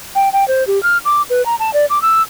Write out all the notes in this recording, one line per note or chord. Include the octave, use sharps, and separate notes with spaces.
G5
G5
C5
G4
F6
D6
B4
A#5
A5
D5
D6
E6